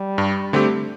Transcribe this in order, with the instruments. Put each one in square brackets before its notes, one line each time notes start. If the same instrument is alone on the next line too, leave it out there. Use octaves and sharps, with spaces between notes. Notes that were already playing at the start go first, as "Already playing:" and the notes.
Already playing: [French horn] G3
[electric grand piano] G2
D3 A3 C4 G4